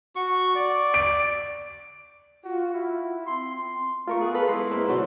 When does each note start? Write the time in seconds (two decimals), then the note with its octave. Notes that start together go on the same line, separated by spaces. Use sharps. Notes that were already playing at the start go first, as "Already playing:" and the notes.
0.16 F#4 C#6
0.55 D5
0.94 D7
2.44 F4 F#4
2.74 E4
3.26 C4 C6
4.08 A3 F4 A#4 C#6
4.21 B3 G#4
4.35 A4 B4 F5
4.49 G#3 E4 C6
4.71 A#3 C4 B4
4.89 B2 D3 F#3 A3 C4